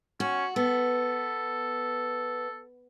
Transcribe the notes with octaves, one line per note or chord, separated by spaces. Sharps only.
C#4 F#4
B3 A4